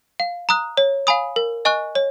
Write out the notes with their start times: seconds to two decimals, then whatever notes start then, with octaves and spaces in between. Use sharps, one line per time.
0.20 F5
0.49 A#5 D#6 F#6
0.77 C#5
1.07 F5 G#5 B5 D#6
1.36 A#4
1.65 D#5 G#5 C#6 F#6
1.95 C#5